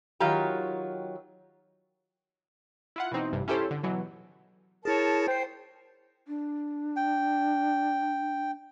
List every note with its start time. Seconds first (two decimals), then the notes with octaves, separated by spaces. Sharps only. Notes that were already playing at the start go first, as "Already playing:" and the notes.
0.20 D#3 F#3 F4 G4 A#5
2.96 E4 F4 F#5
3.12 B2 E3 C4 D#4
3.32 A1 G2 C3
3.48 C#4 E4 G4 A4 C5
3.71 D3
3.83 B2 E3 F#3
4.85 E4 G#4 A#4 C#5 A5
5.28 C5 G5 C7
6.28 D4
6.96 G5